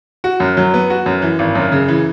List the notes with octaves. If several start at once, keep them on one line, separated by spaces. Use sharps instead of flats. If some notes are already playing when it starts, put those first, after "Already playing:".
F#4
F#2
F#3
B3
F#4
F#2
E3
G#1
F#2
C#3
E3